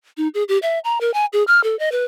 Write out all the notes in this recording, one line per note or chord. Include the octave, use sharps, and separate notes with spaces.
D#4
G#4
G4
E5
A#5
A#4
G#5
G#4
F6
A4
D#5
B4